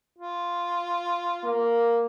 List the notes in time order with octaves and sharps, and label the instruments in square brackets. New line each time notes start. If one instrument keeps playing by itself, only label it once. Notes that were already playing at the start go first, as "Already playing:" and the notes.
[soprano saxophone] F4
[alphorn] A#3